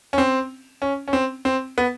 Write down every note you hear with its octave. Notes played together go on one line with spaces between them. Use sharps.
C#4
C4
C#4
C#4
C4
C4
B3